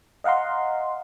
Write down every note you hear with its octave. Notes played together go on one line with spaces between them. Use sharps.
D#5 F5 F#5 A#5 C6